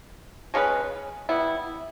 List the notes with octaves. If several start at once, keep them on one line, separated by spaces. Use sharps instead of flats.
G#3 C#4 G#4 B4
G3 B3 E4